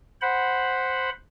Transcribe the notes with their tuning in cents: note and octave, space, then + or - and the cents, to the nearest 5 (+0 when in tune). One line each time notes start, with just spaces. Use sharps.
C5 +0 F#5 +0 B5 +0